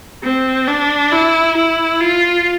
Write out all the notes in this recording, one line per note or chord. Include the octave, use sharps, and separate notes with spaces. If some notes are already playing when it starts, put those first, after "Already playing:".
C4
D4
E4
E4
F4